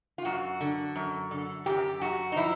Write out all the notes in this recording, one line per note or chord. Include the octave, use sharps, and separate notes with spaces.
F4
F#2 F#4
D3
F#2
D3
F#2 G4
F#2 F#4
D#4
F3 E4